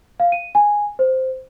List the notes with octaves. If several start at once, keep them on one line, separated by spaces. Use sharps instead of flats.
F5
D#7
G#5
C5